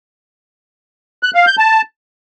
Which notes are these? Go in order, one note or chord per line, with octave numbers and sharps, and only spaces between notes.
F#6
F5
G6
A5